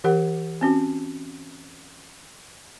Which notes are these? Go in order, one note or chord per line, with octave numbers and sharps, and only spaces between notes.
E3 G4 A#4 F#5
C4 C#4 F#4